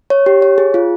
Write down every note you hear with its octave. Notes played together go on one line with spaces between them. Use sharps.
C#5
G4
C#5
G#4
F4